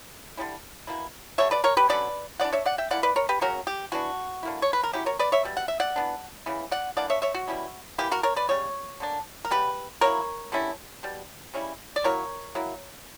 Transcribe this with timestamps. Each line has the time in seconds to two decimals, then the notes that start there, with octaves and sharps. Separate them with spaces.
0.37 D3 G3 C#4 E4
0.87 B2 A#3 E4
1.38 D3 G3 C#5 E5
1.51 B4 D5
1.64 A#4 C#5
1.77 G4 B4
1.89 D3 F#3 C#4 B4 D5
2.40 E3 B3 D4 D5 F#5
2.53 C#5 E5
2.66 D5 F#5
2.78 E5 G5
2.91 D3 A#3 E4 D5 F#5
3.03 B4 D5
3.16 A#4 C#5
3.29 G4 B4
3.41 C#3 F#3 C#4 F#4 A#4
3.67 G4
3.92 E3 B3 D4 F#4
4.43 D3 A#3 E4
4.62 C#5
4.73 B4
4.83 A#4
4.93 F#3 C#4 E4 G4
5.06 A#4 C#5
5.19 B4 D5
5.32 C#5 E5
5.45 B2 G3
5.57 F#5
5.68 E5
5.80 D5 F#5
5.96 E3 B3 D4
6.46 C#3 E3 B3
6.71 D5 F#5
6.97 E3 A#3 D4 D5 F#5
7.10 C#5 E5
7.22 C#5 E5
7.35 F#4
7.48 B2 G3 C#4 E4
7.98 E3 A#3 E4 G4
8.11 F#4 A#4
8.23 A#4 C#5
8.36 B4 D5
8.49 C#3 G3 C#5
9.00 D3 A#3 D4
9.45 A#4
9.51 C#3 G3 B3 G4 B4
10.01 F#3 A#3 E4 A#4 C#5
10.52 D3 G3 C#4 E4
11.03 B2 G3
11.54 C#3 G3 C#4 E4
11.96 D5
12.04 F#3 A#3 E4 A#4 C#5
12.55 F#3 A#3 E4